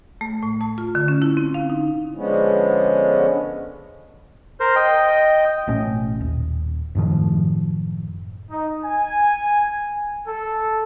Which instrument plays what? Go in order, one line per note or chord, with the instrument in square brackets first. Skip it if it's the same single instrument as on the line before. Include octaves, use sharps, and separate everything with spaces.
[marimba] A3
A2
A5
F4
D3
C#4
E4
C4
F5
D#4
[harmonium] D3 F3 G#3 B3 C#4
[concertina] A#4 C5
D#5 G5
[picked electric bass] A1 B2 A3 C#4
D#1
F#2 A2 D#3 F3
[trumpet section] D#4
G#5
A4